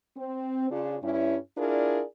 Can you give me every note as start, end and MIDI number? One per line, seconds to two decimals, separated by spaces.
0.17 0.69 60
0.71 0.97 49
0.71 0.97 62
0.71 0.97 65
1.03 1.36 43
1.03 1.36 61
1.03 1.36 64
1.58 2.03 62
1.58 2.03 64
1.58 2.03 65
1.58 2.03 68
1.58 2.03 70
1.58 2.03 74